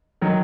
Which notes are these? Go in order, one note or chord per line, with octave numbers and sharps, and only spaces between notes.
D#3 F#3